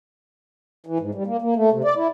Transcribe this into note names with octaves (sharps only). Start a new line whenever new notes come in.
E3
G#2
G3
A#3
A#3
A3
C3
D5
E4